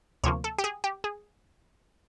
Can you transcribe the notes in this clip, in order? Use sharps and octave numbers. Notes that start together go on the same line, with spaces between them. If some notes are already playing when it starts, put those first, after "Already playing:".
D2 C3 F3 A#3 C#5
A4
G4
G#4
G4
G#4